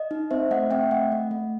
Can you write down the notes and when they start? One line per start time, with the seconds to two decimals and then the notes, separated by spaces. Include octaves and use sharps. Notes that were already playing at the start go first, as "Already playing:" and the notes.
Already playing: D#5
0.11 D#4
0.31 C4 C5 E5
0.51 A3 D#5 F#5
0.71 C4 E5 G5
0.91 A3 D#5 F#5
1.12 A3 D#5
1.31 A3